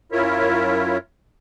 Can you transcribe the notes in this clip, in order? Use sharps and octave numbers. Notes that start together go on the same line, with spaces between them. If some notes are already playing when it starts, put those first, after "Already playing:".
F#2 E4 F4 A#4 C#5 E5